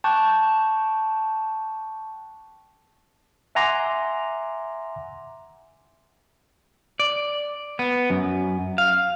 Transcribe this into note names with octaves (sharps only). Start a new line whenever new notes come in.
G5 A5 C#6 D6 F#6 G6
E5 F#5 G#5 A#5 C6 D6
D5
B3
F#2
F5